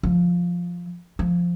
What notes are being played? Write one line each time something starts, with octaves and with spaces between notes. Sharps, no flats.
F3
F3